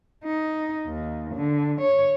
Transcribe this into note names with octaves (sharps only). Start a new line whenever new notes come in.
D#4
D#2
D3
C#5